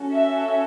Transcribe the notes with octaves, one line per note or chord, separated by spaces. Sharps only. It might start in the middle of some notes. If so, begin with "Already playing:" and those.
Already playing: C#4 F#4 A4
E5